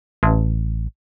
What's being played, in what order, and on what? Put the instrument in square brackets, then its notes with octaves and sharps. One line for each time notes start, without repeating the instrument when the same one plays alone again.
[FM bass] A1